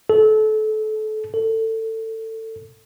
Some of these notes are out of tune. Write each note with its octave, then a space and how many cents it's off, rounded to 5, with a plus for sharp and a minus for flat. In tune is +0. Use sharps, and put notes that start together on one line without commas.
A4 -30
A4 +20